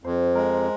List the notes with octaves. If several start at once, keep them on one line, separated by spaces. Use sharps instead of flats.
F2 C5
G#3 A#4